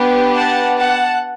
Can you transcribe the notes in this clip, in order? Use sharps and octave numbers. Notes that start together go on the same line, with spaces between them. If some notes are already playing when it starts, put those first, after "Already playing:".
Already playing: B3 D4 G4
F#5 A5
F#5 A5